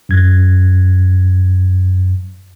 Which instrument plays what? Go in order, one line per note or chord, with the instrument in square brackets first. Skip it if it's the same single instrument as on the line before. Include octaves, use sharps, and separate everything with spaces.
[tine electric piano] F#2 G#6